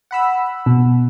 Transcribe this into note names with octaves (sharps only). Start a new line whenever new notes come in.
F#5 B5 E6
B2